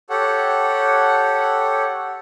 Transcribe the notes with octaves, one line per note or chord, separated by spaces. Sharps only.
G4 A4 C#5 F#5